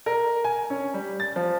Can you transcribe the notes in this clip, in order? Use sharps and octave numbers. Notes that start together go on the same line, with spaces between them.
A#4
G#5
C#4
G3
A6
F3